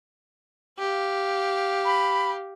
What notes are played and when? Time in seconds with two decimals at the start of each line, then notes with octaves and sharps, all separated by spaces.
0.79 G4 F5
1.85 B5